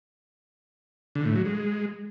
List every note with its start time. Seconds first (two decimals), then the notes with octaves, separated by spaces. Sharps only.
1.15 D3
1.25 A2
1.35 F#3
1.45 G#3